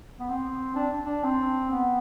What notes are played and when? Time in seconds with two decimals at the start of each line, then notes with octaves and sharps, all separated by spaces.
0.20 B3
0.29 C4
0.76 D4
1.04 D4
1.24 C4
1.71 B3